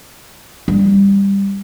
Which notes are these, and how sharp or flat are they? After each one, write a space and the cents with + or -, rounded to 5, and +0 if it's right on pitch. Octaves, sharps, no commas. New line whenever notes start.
G3 +15 E4 +0